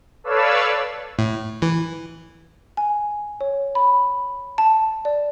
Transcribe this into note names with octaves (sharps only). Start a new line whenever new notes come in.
A4 B4 C#5 D5 F5 E6
A2
E3
G#5
C#5
B5
A5
D5